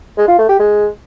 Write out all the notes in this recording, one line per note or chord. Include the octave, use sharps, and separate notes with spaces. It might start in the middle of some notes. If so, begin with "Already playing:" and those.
G#3
F4
A3
G4
G#3